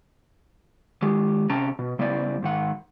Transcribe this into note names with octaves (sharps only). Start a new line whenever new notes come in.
D#3 G#3 G4
C3 C#4 G5 A5 A#5
B2
C#3 G3 B3 E4 C5 D5
G#2 D#3 F#5